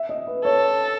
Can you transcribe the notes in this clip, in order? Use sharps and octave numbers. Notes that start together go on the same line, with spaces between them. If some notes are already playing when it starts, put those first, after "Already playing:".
Already playing: E5
D#5
B4
A4 C#5